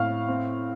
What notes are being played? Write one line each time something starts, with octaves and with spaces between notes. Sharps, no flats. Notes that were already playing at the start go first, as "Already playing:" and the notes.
Already playing: A2 C4 F5 F6
C4